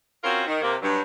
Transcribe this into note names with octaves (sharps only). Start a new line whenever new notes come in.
C4 C#4 F4 F#4 A#4 C#5
D#3
C3 A#3
G2 F#3